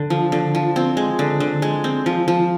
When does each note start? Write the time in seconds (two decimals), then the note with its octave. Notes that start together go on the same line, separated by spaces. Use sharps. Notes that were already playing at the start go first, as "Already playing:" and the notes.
Already playing: D3
0.10 F3
0.32 D3
0.55 F3
0.76 C4
0.97 G#3
1.19 D3
1.40 D3
1.62 G#3
1.84 C4
2.06 F3
2.28 F3